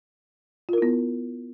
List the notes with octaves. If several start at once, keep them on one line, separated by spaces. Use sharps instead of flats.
B3 E4 F4 A#4